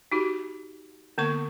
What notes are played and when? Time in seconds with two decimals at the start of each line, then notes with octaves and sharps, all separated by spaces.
0.12 D#4 F#4 G4
1.18 D3 A#3 B3 C#6